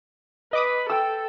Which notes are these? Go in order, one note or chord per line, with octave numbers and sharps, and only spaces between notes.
B4 D#5 D6 D#6
A4 G5 E6